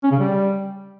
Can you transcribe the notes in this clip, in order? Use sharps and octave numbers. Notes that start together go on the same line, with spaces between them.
C#4
C#3
G3